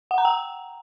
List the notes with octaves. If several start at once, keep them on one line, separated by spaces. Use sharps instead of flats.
F#5
A#5
G5